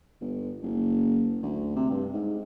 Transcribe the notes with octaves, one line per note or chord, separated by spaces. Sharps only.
G1
F#1
D2
C3
G2
G#2